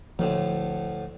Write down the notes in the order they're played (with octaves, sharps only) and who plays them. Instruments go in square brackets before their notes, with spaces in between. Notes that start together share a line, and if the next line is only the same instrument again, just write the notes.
[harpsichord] D2 A2 D3 [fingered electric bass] F3